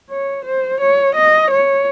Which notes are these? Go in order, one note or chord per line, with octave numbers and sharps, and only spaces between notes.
C#5
C5
C#5
D#5
C#5